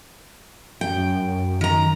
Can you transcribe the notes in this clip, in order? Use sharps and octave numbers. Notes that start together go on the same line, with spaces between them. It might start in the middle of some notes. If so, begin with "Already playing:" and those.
F#2 G5
D#3 A#5